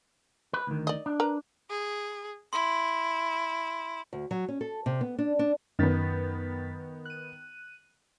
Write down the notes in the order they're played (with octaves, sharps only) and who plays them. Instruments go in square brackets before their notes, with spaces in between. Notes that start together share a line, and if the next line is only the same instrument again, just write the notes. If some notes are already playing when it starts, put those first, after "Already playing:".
[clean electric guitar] B4
D2 D#3
[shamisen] D5 D#5
[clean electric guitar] D4
[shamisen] A#4 B4 A#5
[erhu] G#4
[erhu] E4 [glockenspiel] C6
[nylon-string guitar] D2
F#3
C#4
A4
C3
B3
D4
D4
[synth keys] F#2 A6 B6 [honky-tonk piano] D#3 B3
[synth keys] F#6 D#7